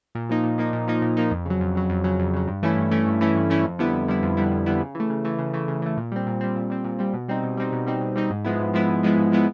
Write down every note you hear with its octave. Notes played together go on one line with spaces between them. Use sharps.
A#2
F3 A#3 D#4
A#2
F3 A#3 D#4
A#2
F3 A#3 D#4
A#2
F3 A#3 D#4
F2
C#3 F#3
F2
C#3 F#3
F2
C#3 F#3
F2
C#3 F#3
G2
E3 A3 C#4 E4
G2
E3 A3 C#4 E4
G2
E3 A3 C#4 E4
G2
E3 A3 C#4 E4
F2
D3 G3 B3 E4
F2
D3 G3 B3 E4
F2
D3 G3 B3 E4
F2
D3 G3 B3 E4
C#3
E3 A3
C#3
E3 A3
C#3
E3 A3
C#3
E3 A3
A#2
G3 C4
A#2
G3 C4
A#2
G3 C4
A#2
G3 C4
B2
G3 C4 D#4
B2
G3 C4 D#4
B2
G3 C4 D#4
B2
G3 C4 D#4
G#2
F3 G#3 B3 E4
G#2
F3 G#3 B3 E4
G#2
F3 G#3 B3 E4
G#2
F3 G#3 B3 E4